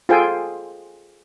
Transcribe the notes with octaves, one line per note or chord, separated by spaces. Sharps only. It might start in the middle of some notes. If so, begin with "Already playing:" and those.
F4 G#4 A4 C5 G5 G#5